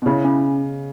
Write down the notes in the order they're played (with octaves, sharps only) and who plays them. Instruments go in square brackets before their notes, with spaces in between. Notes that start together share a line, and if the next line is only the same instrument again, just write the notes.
[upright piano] B2
[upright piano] C#3 [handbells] E4
[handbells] C#4